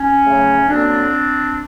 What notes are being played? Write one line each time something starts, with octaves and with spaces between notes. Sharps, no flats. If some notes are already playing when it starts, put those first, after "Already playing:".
Already playing: C#4
C#3 F#3 A3
D3 F#3 A#3 C4 D4